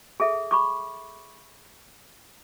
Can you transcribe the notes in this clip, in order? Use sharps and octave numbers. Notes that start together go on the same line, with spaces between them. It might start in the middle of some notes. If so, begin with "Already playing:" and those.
G#4 A4 E5
B5 C#6 D6